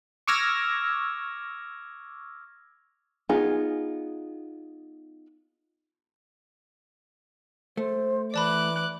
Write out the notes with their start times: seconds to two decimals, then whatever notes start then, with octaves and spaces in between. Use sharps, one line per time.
0.27 C#6 D6 E6 F6 G#6 A#6
3.29 B3 D#4 F4 G#4
7.77 A3 C5
8.34 E3 D5 A5 B5 D6 F#6